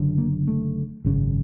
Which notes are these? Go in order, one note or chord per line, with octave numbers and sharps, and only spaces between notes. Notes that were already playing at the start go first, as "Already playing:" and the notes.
Already playing: F#1 F#2 D3
A#3
A3
G#1 F#2 C#3